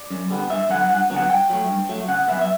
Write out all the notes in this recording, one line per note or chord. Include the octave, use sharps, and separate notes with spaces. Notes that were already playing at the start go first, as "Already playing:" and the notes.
Already playing: D5
F#2
D3 G3 B3
G2 E5
D3 F#3 B3 F#5
G2 F#5
D3 F#3 B3
F#5
G2 G5
F#3 A3
G2
F#3 A3
C#3 F#5
F#3 B3 E5
E5